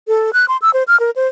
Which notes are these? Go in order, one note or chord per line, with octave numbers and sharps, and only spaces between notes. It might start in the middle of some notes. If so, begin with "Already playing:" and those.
A4
F#6
C6
E6
C5
F6
A#4
C5